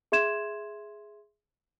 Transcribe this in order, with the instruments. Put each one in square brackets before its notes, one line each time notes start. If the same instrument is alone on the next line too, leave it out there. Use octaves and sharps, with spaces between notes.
[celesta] G#4 E5 C6 G#6 E7